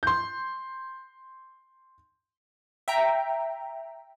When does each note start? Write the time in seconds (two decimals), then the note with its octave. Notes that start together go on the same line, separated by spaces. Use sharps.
0.03 C6 G6
2.88 E5 G5 A#5